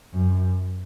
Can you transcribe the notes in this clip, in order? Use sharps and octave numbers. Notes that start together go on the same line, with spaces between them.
F#2